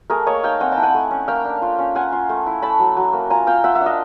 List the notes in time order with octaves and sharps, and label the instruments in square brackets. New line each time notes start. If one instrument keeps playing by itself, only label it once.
[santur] A3 G#4 A#4
A#3 C#5 D#5
D#4 F5 G5
C4 F#5 G#5
G5 A5
E4
F#5 G#5
A3
C#4
A#3 F5 G5
D4
F4
C#4
F4 F#5 G#5
F4
A3
E4
A3 A5 B5
F#3
F#3
A#3
F4 G#5 A#5
F4 F5 G5
F4 E5 F#5
E5 F#5
D4
D#5 F5